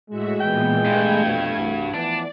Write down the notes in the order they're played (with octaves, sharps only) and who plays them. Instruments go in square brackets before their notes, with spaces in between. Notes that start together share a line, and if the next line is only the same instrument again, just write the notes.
[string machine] A2 F#4 E5 [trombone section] G#3
[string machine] A#2 E3 B3 [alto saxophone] G5
[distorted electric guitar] G2 [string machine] A3 G#6
[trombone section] F2 B2
C2 E3 F#4
[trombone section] E3 F3 B3 [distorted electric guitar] D4 [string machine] D5